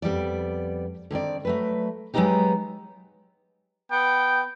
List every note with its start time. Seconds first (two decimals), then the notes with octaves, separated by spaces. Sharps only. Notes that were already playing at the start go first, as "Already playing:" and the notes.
0.02 F2 G3 B3 D5
1.11 D3 D#3 C4 D5
1.45 F#3 A3 B4
2.14 F#3 G#3 A#3 B3 D#4 G4
3.92 B3 G5